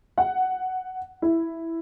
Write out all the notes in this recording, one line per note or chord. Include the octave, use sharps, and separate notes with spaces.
F#5
E4